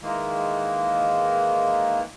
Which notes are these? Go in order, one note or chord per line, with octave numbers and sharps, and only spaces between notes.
D#3 E3 G#3 A#3